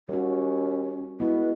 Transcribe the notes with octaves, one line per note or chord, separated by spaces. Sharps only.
D#2 G3 C#4 F#4
B2 G#3 B3 E4 B4